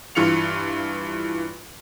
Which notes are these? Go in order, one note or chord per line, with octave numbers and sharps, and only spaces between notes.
G2 E3 F4 C#7 F7